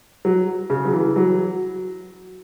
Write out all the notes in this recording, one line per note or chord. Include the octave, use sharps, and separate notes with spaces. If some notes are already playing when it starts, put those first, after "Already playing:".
F#3
C#3
F#3
E3
F#3